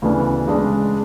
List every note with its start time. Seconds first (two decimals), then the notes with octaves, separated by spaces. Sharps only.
0.02 D2 C#3 E3 B3 D4
0.48 C#3 G#3 D4